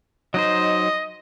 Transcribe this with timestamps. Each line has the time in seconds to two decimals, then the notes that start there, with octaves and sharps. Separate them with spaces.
0.34 F#3 D#4 C5 D#5